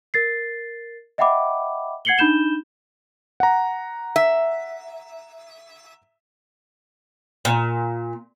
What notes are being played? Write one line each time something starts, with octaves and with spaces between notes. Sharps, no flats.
A#4 A6 C7
D#5 E5 F#5 G5 B5 D6
F#5 G#6 C7 C#7 F#7 G7
D4 D#4 B5 G6 E7 G7
F#5 A#5
E5
A#2